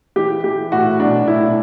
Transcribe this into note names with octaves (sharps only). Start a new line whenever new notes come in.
E3 G4
E3 G4
A2 F#4
B1 D4
A2 E4